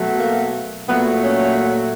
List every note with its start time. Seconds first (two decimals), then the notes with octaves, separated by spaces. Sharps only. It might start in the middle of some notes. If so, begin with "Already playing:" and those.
Already playing: B2 F#3 A3
0.17 A#3
0.88 A#2 F#3 A3 B3
1.23 B3 C#4